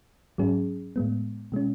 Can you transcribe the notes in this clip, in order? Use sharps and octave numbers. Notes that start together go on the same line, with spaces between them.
G#2 F#3 C#4 G#4
A2 G#3 B3
B2 G#3 C#4